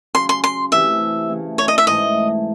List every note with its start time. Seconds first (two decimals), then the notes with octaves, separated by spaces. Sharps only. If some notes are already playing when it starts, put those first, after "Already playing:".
0.15 C#3 F#3 C#4 C6
0.29 C6
0.44 C6
0.72 C3 E3 A3 E5
1.29 C#3 E3 A3
1.58 C#5
1.68 D#5
1.78 E5
1.87 G#2 E3 A3 D#5